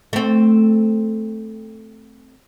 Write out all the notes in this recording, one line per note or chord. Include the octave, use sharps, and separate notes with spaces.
A3 C4